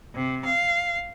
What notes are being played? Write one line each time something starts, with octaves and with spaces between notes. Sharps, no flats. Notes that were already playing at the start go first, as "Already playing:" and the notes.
C3
F5